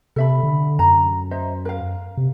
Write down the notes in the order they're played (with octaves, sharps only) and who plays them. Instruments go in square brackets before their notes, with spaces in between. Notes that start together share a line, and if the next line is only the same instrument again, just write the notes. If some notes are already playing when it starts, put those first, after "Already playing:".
[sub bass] C3 [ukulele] A4 E5 B5
[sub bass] D3
[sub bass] F#2 [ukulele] A#5
[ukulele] C5 D#5 E5
A#4 F5
[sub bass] C3